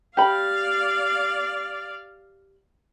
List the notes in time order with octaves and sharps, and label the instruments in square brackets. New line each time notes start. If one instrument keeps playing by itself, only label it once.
[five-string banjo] G4 B5 [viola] D5 F5